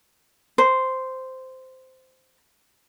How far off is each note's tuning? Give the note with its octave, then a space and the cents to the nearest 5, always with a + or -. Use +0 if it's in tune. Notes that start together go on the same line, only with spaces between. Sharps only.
C5 -10